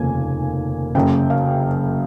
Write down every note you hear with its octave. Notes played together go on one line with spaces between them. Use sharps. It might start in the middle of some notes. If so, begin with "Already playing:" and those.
Already playing: F1 D#2 C#3 F3 A#3 G#5
F#1 F#2 C#3 G5
F5